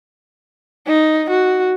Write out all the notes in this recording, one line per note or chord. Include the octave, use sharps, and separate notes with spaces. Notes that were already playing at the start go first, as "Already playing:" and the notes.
D#4
F#4